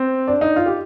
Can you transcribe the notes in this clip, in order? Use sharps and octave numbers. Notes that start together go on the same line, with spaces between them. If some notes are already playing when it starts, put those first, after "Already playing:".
Already playing: C4
D4
D#4
F4
G4